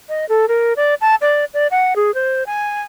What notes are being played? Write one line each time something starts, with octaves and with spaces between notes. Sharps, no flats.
D#5
A4
A#4
D5
A5
D5
D5
F#5
G#4
C5
G#5